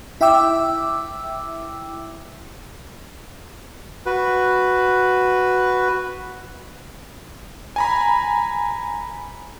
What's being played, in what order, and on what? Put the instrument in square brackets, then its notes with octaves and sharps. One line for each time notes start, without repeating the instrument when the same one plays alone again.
[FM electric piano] E4 E5 G5 D6 E6
[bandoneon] F#4 B4
[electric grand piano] G#5 A#5 B5